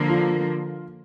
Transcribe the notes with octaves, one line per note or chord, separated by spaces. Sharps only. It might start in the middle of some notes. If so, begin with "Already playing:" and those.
Already playing: D3 F3 A#3
F4